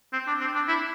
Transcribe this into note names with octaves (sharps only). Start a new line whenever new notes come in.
C4
D4
C4
D4
E4